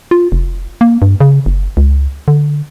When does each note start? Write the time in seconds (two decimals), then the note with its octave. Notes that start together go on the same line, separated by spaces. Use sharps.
0.11 F4
0.32 F1
0.81 A#3
1.02 G2
1.20 C#3
1.46 F#1
1.77 C#2
2.28 D3